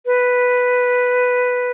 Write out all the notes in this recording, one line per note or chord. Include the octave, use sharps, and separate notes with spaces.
B4